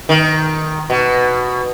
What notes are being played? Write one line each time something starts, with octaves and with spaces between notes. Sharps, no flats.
D#3
B2